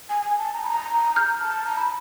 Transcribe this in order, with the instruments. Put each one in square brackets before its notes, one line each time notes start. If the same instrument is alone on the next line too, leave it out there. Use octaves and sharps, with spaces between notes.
[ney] G#5
G#5
A5
A#5
B5
A#5
[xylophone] F6 G6
[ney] A5
A#5
B5